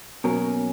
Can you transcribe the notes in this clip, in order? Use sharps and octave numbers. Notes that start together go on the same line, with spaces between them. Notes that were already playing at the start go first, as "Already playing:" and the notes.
B2 F#3 A#3 C#4 A#4